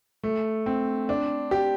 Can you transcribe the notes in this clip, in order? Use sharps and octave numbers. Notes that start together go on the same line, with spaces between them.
A3
C4
D4
G4